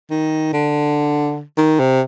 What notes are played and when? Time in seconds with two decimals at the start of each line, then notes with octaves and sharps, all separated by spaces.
0.10 D#3
0.53 D3
1.57 D#3
1.79 C3